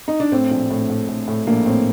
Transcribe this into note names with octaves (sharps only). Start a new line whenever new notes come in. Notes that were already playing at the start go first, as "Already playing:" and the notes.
D#4
D4
A2 C4
A#1
A2
A2
A2
A2
A#1 A#3
A2 C4